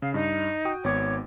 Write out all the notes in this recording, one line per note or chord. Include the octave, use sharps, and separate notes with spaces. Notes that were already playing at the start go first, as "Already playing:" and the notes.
C#3 F5
G2 D#4
F#4 G5 D#6
G#1 B3 C#5 D6